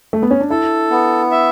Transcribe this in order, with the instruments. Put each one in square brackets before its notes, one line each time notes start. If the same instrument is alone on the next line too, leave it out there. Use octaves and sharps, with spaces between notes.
[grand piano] A3
B3
C#4
D4
[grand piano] E4 [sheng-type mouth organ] A4
[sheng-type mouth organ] B3
E5